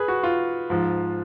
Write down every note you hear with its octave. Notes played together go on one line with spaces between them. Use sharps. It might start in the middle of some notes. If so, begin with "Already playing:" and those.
Already playing: G#4 B4
F#4
F4
G#2 F3